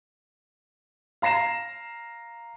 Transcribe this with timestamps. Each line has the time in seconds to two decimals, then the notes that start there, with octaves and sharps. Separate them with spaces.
1.22 F5 A#5 A#6 C7 E7